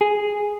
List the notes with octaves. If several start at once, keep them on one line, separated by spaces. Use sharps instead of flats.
G#4